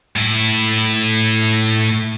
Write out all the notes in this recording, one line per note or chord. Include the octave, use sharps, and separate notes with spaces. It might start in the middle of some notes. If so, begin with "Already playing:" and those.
A2 E4